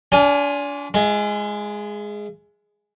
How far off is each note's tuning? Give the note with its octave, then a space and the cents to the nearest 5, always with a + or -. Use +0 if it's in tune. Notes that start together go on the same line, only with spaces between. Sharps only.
D4 -35 F4 +15 G#5 +0
G#3 +0 E4 +45